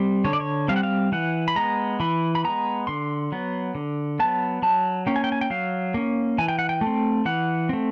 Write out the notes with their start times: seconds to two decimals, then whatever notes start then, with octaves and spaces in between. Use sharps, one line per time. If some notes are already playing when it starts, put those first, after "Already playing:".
Already playing: G3 C4
0.24 D3 C#5
0.33 D5
0.40 C#5
0.68 G3 C4 F5
0.76 F#5
0.83 F5
1.12 E3 F#5
1.48 B5
1.56 G#3 B3 A#5
2.00 E3 B5
2.35 B5
2.44 G#3 B3 A#5
2.87 D3 C6
3.32 F#3 B3
3.75 D3
4.19 F#3 B3 A5
4.62 F#3 A5
5.07 A#3 C#4 G5
5.16 G#5
5.24 G5
5.32 G#5
5.41 G5
5.50 F#3 F5
5.94 A#3 C#4
6.38 E3 G#5
6.48 G5
6.59 F#5
6.69 G5
6.81 A3
6.86 C4
7.25 E3 F#5
7.69 A3 C4